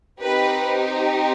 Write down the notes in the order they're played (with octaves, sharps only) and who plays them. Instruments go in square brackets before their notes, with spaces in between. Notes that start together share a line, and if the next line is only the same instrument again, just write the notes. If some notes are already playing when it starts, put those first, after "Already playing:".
[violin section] C4 D#4 G4 B4